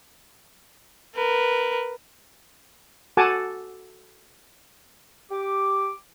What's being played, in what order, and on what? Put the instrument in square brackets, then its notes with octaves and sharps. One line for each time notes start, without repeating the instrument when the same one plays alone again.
[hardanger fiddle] A#4 B4
[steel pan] F#4 A4 F#5 G#5 A5 D6
[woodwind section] G4 D6